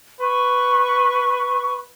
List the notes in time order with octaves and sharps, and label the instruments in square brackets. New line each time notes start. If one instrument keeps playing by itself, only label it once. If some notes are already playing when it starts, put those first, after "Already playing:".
[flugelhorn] B4 [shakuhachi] C#6